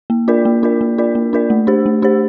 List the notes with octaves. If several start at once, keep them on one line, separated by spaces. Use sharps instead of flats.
A#3
D4 F4 A#4 D5
A#3
D4 F4 A#4 D5
A#3
D4 F4 A#4 D5
A#3
D4 F4 A#4 D5
A3
D4 G4 C5
A3
D4 G4 C5